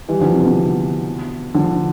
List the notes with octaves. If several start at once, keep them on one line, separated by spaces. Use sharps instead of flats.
E3 G3
D3 F3
C3
B2 D3
D3 F3